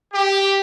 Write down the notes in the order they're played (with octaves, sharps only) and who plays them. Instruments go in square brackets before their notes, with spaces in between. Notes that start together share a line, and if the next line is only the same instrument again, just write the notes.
[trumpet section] G4